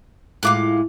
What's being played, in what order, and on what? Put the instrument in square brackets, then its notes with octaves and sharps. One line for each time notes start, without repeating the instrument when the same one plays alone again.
[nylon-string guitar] A2 G#3 F4 [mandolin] F5 D6 F#6